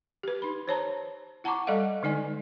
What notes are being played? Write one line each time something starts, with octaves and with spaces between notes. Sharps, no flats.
G4 B4
D#4 B5
C5 C#5 A5 A#5
E4 F#5 A5 A#5 C#6 D6
G3 A4 D5 D#5 F5 F#5
D3 G#3 D#4 D5 G#5